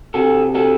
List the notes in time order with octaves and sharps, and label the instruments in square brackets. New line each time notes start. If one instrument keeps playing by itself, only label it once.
[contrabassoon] C3 [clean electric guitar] F#4 A4
[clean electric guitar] F#4 A4